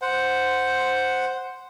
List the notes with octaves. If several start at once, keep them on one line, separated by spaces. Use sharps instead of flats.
C5 F#5